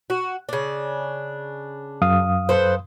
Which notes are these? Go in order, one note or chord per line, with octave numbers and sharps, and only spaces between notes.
F#4
C#3 D4
F#2 F5 D#6
A4 B4 C5